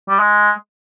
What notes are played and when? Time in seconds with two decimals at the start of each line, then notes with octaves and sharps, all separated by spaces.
0.09 G3
0.19 G#3